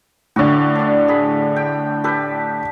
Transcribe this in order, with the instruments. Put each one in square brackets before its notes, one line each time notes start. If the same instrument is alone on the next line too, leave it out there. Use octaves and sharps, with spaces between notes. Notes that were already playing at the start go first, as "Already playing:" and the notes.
[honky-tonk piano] A2 D3 [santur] C#4 F#4
[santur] D4 D5
G#4 B5
G5
G4 A4 B4